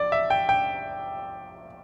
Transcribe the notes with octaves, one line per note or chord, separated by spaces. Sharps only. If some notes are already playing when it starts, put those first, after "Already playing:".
Already playing: A#1 D5
E5
G5
G5